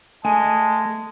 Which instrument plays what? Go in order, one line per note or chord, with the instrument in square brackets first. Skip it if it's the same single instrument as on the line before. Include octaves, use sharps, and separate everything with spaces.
[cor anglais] G#3 [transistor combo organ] A3 [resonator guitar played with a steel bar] G#5 [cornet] A5